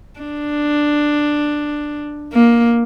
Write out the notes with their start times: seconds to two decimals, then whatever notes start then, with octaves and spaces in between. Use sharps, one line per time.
0.20 D4
2.33 A#3